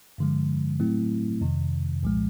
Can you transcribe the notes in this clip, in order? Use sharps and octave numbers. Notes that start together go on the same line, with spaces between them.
G2 D3 F3 G#3
A2 F#3 A3 C4 E4
F2 C3 D#3
C2 A#2 F3 G#3